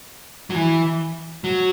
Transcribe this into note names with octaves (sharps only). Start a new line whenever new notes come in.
F#3
E3
F#3